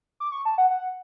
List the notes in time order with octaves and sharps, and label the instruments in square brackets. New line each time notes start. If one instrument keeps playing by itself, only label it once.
[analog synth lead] D6
C#6
A5
F#5
F#5